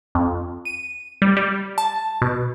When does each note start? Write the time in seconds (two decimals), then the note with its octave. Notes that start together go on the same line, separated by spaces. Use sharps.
0.15 F2
0.65 D#7
1.22 G3
1.37 G3
1.78 A5
2.22 B2